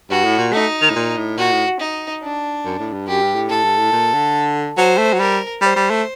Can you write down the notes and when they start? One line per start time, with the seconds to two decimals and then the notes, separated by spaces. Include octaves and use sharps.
0.10 G2 F#4
0.25 A2
0.39 A#2
0.53 A3 D#4
0.81 D#3
0.90 A2
0.96 A#2
1.17 A2
1.38 A#2 F#4
1.52 A2
1.80 D#4
2.22 D4
2.65 F#2
2.79 A2
2.93 G2
3.07 F#2 G4
3.22 G2
3.35 A2
3.50 A2 A4
3.64 G2
3.78 A2
3.92 A#2
4.13 D3
4.77 F#3 C5
4.98 A3
5.13 F#3
5.19 G3 A#4
5.61 G3 C5
5.76 G3
5.90 A3